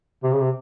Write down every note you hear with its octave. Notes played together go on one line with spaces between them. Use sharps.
C3
C#3
C3